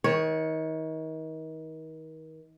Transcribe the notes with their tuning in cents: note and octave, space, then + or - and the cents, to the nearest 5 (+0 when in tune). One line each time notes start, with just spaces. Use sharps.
D#3 +35 C#5 +0